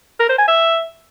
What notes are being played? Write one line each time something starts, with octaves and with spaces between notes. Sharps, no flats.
A#4
C5
G#5
E5